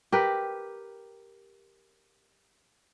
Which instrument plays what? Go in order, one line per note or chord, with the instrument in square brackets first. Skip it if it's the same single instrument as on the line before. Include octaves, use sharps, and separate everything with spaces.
[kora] G4 A#4 B4